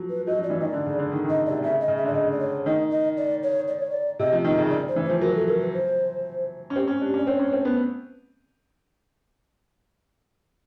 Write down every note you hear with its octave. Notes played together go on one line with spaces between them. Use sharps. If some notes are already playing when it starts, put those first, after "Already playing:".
Already playing: F3 F#3
B4
F#3 D#5
F3
D5
E3
D#3 D#5
D5
D3
C#3
D3
D#3
D#3
D#5
C3 D5
C#3 E5
D#5
C#3
E5
D3 D5
C#3 D#5
D5
C#5
D#3 D#5
D#5
D5
C#5
D5
C#5
D5
C3 D#5
F3
D#3 D#5
C#3
D5
C5
E3
F3 C5
F#3 A#4
A4
A#4
B4
C5
C#4
C4 G4
C#4
D4
C#4
D5
C4 C#5
C#4
C4
B3